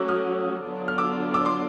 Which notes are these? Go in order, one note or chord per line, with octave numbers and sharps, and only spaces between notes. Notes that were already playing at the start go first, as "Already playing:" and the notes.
Already playing: F#3 A3 C#4 F#4 D6 E6
D#6 F6
D3 F#3 B3 D4 F4
F6
D6 E6
D6 E6
C6 D6